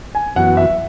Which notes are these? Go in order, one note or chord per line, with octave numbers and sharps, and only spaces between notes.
G#5
F#2 E3 B3 F#4 F#5
E5